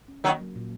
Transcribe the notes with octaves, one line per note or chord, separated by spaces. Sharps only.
C#4
D#3 F#3 A#3
F#3
A#2